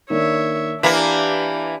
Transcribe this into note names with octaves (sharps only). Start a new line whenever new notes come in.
D#3 A#3 D4 C#5 E5
E3 A#3 D4 G4 B6